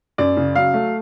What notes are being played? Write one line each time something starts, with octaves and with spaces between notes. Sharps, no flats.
F#2 D5
C#3
F#3 F5
A3